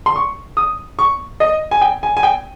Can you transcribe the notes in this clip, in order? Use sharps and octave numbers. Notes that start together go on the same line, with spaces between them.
C6
C#6
D#6
C#6
D#5
G#5
G5
G#5
G#5
G5